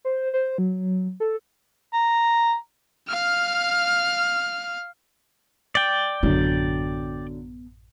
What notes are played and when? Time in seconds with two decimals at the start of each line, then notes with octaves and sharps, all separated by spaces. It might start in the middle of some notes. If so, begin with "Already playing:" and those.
0.05 C5
0.34 C5
0.58 F#3
1.20 A4
1.93 A#5
3.08 F5 F6
5.75 D5 G5
6.23 A1 F#2 D3 F#3 B3